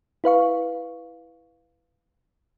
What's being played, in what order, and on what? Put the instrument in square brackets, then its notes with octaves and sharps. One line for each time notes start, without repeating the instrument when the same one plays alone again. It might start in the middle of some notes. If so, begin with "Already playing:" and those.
[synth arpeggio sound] E4 B4 F5 C#6